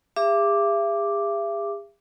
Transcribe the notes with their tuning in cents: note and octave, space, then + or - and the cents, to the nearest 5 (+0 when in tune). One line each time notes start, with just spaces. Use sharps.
G#4 -45 E5 +40 D6 +0